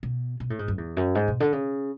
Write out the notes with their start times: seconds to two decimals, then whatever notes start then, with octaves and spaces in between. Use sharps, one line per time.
0.03 B2
0.40 B2
0.50 A2
0.59 G#2
0.68 F#2
0.78 E2
0.97 F#2
1.15 G#2
1.28 B2
1.40 D3
1.52 C#3